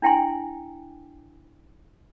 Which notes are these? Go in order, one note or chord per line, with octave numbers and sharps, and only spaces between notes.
D4 E4 G5 G#5 C6